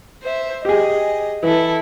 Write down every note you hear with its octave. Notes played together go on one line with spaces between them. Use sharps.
C5 E5
G4 G#4 D#5
E3 E4 A4